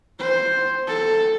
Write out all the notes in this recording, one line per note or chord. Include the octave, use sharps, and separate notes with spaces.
C5
A4